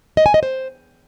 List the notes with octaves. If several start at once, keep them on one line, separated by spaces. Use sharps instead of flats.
D#5
G#5
D#5
C5